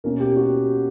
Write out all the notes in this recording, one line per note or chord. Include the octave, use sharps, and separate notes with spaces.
B2 A#3 C#4 A#4
G4
F#4